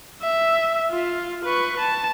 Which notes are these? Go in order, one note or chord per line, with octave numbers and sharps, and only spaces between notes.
E5
F4
B4 C#6
A5